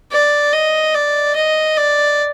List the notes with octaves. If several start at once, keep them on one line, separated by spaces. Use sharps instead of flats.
D5
D#5
D5
D#5
D5